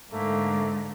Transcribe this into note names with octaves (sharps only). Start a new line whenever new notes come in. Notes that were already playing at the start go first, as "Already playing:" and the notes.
G#2 D3 A3 A#3